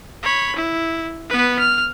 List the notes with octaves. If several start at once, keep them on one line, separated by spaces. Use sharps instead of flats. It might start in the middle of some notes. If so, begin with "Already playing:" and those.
C#5 B5
E4
B3 B4
F6